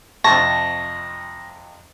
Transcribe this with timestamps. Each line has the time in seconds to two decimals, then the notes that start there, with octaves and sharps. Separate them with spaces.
0.24 F2 C3 A5 C#6 A#6